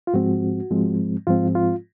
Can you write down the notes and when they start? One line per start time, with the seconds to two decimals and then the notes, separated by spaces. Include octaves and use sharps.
0.07 F4
0.14 G#2 F3 G#3 C4 F#4
0.70 G#2 F3 G#3 C4
1.27 G#2 F3 G#3 C4 F4
1.55 F4